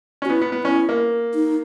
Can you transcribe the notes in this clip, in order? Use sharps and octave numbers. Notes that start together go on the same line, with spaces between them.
C#4
F#4
B3 E4
B3
B3
C#4 E4
A#3
D#4